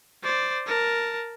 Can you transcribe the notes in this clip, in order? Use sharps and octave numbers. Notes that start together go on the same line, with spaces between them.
C5 D5
A#4 A5